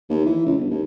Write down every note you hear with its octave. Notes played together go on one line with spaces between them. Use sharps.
D#2
E3
C#2
G1
D#2